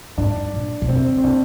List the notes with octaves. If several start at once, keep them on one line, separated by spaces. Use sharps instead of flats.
G#2 D4
A#2
A#2
C3 C4
C4
C3 D4